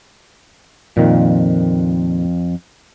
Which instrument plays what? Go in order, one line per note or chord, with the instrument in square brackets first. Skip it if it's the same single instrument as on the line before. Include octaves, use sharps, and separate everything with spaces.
[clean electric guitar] F2 [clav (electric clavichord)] A#2 D#3